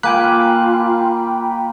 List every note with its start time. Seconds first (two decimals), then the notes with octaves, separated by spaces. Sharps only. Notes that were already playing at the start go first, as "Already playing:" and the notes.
0.03 A#3 F4 G5 G#5 B5 F#6